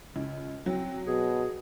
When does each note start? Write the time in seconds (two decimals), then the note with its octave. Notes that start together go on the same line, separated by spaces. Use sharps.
0.16 C#2
0.66 F#3 C4
1.07 B2 G#4